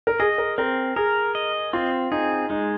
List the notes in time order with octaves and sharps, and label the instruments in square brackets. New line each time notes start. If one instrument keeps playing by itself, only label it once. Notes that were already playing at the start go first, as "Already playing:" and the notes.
[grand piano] A#4
[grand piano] G#4 [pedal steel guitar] D#5
[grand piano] A#4
[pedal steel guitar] C4 [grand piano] A#4
[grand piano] G#4 [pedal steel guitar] A#4
[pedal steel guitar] D#5
[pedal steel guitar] C4 [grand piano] F4
[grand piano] D#4 [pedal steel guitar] G#4
[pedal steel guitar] G#3 [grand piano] D#4